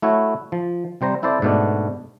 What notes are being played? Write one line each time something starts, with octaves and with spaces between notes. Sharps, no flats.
A3 E4 F#4 C#5
F3
C3 G3 C5 A#5
C4 E4 A4 C5 D5
G#2 B2 A3 B3 D4